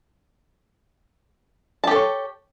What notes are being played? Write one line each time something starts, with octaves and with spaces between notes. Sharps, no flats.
G4 A4 C#5 A5